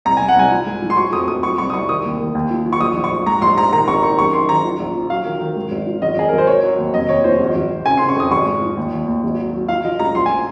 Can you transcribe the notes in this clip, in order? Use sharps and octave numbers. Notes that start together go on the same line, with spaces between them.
C2 A#5
C2 G#5
F#5
C2 G#5
F3
G#2
F3
C6
F#3 C#6
F2 D#6
F2 D#6
F#3 C#6
C2 C#6
D#6
C2 C#6
D#3 D#6
D#2
D#3
D#2
F3
F3
C#6
A#1 D#6
A#1
C#6
A#1
G#2 A#5
A#1 C6
A#1 A#5
D#3 A#5
G#1 C#6
D#3 C#6
F#1 C#6
D#3 C6
D#3 A#5
F3
A#1
F3
F#3 F5
D#3
D#3
G#2
G#1
F3
G#1 D#5
G#1 G#4
G#1 A#4
C5
F#3 C#5
F#3
D#2
F1 D#5
D#2 C#5
F3 C5
G#1
G#1
G#1
C#3 G#5
C6
C#3
C#6
F2 D#6
G#1 C#6
G#2
F3
D#2
D#2
D#2
G#1
F#3
F#3
F3 F5
F3 D#5
C#2 A#5
A#1 C6
G#5